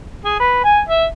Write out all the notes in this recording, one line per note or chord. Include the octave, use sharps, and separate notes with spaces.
G#4
B4
G#5
E5